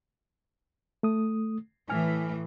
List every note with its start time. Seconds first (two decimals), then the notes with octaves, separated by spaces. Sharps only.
1.03 A3 D#6
1.90 A2 E3 G#5 F6